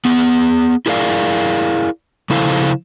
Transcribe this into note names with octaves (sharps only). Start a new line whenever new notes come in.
B3 G#4
E4 G#4 A#4 D5 F5
C#3 F3 E4 A4 C5 F5